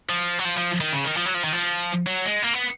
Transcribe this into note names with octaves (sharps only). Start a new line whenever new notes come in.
F3
F#3
F3
F3
D#3
C#3
D#3
F3
F#3
F3
D#3
F3
F#3
G#3
A#3
B3